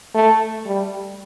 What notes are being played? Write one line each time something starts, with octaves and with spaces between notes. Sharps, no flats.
A3
G3